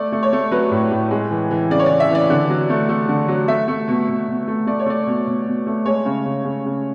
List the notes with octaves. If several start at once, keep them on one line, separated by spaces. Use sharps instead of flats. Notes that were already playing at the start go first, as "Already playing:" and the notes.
Already playing: A3 D5
A3
C#5
A3
F#3 B4
A2
A2
G#3
E3
E3
C#3 D5
C#5
E3 D5
E5
E3 D5
D3
F#3
A3
A3
D3
F#3
A3 E5
A3
B2
B2
B2
A3
A3 D5
C#5
A3 D5
B2
B2
B2
A3
G#3 C#5
C#3
C#3
C#3
C#3